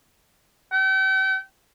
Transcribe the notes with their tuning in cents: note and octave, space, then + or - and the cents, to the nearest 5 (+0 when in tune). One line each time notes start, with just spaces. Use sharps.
G5 -40